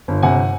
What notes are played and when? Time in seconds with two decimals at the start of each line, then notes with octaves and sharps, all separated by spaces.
0.08 G1
0.23 C3 F#5 G#5